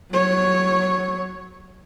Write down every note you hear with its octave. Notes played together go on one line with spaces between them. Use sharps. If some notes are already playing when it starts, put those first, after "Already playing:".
F#3 C#5